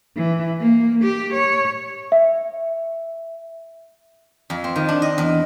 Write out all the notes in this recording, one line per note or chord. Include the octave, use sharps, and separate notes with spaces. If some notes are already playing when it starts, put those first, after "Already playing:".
E3
A#3
G4
C#5
E5
F2
C4
D#3
D4
D#5
E2